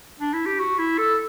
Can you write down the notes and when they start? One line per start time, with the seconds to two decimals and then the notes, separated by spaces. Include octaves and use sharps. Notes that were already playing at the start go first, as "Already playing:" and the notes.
0.20 D4
0.33 E4
0.46 G4
0.59 F#4
0.79 E4
0.98 A4